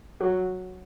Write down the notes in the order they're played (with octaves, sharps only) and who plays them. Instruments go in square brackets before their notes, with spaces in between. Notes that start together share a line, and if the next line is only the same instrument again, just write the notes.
[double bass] F#3 [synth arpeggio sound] F#4